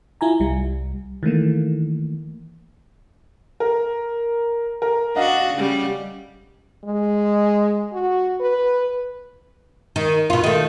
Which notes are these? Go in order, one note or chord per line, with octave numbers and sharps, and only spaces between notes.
E4 F4 G#5 A#5
C2 G3
D#3 E3 A3 A#3
A#4
A#4
D4 F#4 D#5 F5 F#5
C#3 G3
G#3
F#4
B4
D#3
B2 F4
D#3 A3